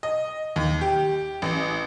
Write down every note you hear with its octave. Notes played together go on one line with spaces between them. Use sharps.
D#5
D#2
G4
A1